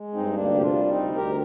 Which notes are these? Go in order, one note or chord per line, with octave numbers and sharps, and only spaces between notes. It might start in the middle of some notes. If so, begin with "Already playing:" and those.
Already playing: G#3
G2 C4 D#4
D2 A#3 D4
C3 G4
D4 F4
G3
C4 D#4
D2
D2 G4 A#4